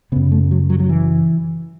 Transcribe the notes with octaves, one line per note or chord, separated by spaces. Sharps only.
F#2 C#3 B3
A3
F#3
F#3
F#3
E3